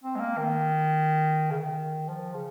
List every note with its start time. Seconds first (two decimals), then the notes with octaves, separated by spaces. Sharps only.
0.04 C4
0.16 G#3
0.20 A#3
0.38 D#3
1.51 C#3
1.58 D#3
2.09 F3
2.34 C#3